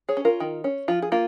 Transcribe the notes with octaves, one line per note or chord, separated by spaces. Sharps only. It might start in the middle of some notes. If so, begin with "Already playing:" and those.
G#4 C#5
C#4
F4 A#4
D#3
C#4
F3 F4
G#4
A#3 F4